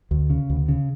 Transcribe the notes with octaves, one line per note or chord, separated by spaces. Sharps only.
D2
C#3
D2
C#3